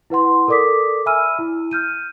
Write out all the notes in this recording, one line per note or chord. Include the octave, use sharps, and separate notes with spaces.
E4 B4 F#5 C6
A4 A#4 D5 D6 D#6 B6
E5 G#5 B5 E6 F6 D#7
E4
F6 G6 D#7